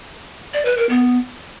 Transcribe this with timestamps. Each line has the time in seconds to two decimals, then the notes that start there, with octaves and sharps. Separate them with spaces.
0.53 D5
0.65 B4
0.77 A#4
0.89 B3